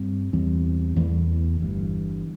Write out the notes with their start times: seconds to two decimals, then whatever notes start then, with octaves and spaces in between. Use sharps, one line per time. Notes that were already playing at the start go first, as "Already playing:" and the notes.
Already playing: G2 G3 C4
0.33 E2 E3 G3 C4
0.96 E2 E3 A3
1.60 G1 G2 E3